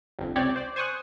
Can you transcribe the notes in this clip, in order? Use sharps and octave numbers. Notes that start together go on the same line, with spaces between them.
G1 F2
C#2 C3 C4 G4 C#5 D5
C5 D5
C5 G#5 C#6 D#6 F#6